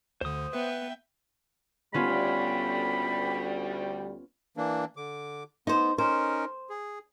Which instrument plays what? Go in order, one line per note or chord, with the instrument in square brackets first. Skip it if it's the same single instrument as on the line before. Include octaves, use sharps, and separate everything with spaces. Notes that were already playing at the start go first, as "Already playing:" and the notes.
[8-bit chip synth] D2 D3 [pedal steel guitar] C5 D#6
[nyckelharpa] B3 [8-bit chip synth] B4 [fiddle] E5 G5
[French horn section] D2 G3 [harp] B3 C#4 F4 [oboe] B5
[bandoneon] E3 A#3 D4
D3 D6
[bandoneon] B3 [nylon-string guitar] D#4 C5
[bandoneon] C#4 D#4 A#4 [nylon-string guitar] C5
[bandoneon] G#4